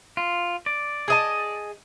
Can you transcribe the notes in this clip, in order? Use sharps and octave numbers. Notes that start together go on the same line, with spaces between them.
F4
D5
G#4 D#5 A5